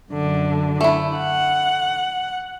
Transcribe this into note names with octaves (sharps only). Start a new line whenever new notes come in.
F#2 D3
A3 E4
F#5